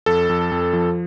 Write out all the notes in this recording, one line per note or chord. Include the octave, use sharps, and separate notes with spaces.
F2 A4
F2
F2
F3